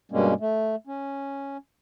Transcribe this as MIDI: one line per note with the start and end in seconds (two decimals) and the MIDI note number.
0.12 0.34 43
0.12 0.34 47
0.12 0.34 55
0.12 0.34 56
0.12 0.34 58
0.12 0.34 61
0.40 0.75 57
0.87 1.57 61